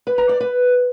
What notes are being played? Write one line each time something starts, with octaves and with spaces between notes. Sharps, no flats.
B4
A#5
D5
B4